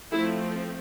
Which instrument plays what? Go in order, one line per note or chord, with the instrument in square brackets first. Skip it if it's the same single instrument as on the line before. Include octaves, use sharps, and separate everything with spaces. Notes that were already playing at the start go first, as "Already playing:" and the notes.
[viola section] F3 A3 C4 E4 G#4